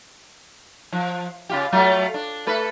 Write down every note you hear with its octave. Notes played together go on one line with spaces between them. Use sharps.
F3
C#3 F4 G4
F#3 A3 F4
D4
A3 A4 B4